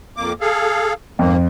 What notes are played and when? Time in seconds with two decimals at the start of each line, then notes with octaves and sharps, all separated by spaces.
0.17 F2 A#3 D6
0.41 G#4 A4 F5
1.19 F2 G#2 A#3